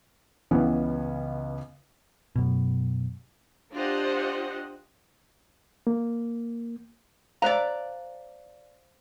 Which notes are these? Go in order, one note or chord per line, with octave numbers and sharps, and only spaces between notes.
C#2 C#3 E3 B3 C#4
F#2 B2
D4 F4 G4 C5 D#5 F#5
A#3
C5 D5 F5 A#5